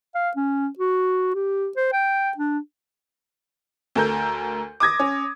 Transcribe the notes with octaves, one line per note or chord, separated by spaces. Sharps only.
F5
C#4
F#4
G4
C5
G5
D4
D2 A4 A#4 G6
D6 D#6 G#6 A#6
C#4